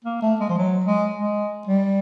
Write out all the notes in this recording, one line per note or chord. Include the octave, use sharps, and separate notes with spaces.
A#3
A3
G#3
F3
F#3
G#3
G#3
G3